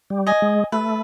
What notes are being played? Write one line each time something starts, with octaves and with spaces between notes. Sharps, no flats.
G3
D#5 G#5
G#3
A3 B4